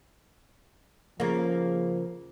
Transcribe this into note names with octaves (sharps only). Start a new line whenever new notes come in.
C#3 F3 A#3